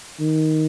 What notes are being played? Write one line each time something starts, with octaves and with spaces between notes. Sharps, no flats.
D#3